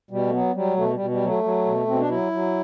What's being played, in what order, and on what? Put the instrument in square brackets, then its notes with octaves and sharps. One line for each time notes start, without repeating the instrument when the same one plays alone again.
[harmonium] B2 G3
A3
F#3 B3
F#3 G3
B2 A3
G3
B2
G3
F#3
A3
F#3
B2
B2 C4
D4
F#3 E4
F#3